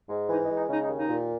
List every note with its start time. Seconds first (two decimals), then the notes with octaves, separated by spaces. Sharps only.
0.09 G#2
0.29 E3 D#4
0.42 D#4
0.49 G#3
0.55 D#4
0.69 C#3 D#4
0.82 D#4
0.89 D#2
0.95 D#4
1.08 A#2